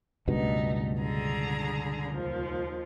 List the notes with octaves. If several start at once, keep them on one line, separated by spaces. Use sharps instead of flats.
C#2 G2 B2 A3 D#4
D3 G#4 A#5
D#2 F3